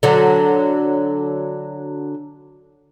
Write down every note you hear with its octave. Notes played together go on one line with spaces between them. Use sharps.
D3 F#3